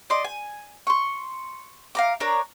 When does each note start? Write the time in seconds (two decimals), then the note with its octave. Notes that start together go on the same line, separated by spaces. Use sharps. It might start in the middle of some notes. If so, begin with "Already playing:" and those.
0.10 D5 D#5 C6 D6
0.24 G#5
0.87 C6 C#6
1.95 F5 A#5 D6
2.20 D4 A#4 C#5 A#5